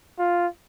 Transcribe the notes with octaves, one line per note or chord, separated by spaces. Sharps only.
F4